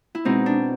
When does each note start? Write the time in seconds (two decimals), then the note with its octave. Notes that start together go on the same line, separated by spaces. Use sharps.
0.15 E4
0.25 B2 G#3 C4 D#4
0.46 D4